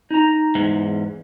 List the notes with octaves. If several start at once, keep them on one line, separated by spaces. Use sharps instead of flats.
D#4 A#5
E2 G#2